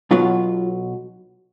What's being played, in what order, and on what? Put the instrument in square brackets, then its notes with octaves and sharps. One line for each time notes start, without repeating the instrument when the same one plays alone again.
[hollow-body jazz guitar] B1 B2 F#3 F4